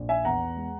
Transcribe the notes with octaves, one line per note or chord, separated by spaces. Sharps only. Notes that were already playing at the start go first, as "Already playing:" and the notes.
Already playing: A#1
E5 G#5
E2 F#5 A#5
G#3